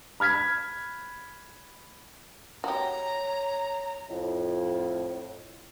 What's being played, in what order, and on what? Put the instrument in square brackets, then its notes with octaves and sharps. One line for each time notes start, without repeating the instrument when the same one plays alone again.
[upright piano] B5 F6 G#6 B6
[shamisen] F#4 G4 [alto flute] C#5 [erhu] A#5
[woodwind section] F2 A2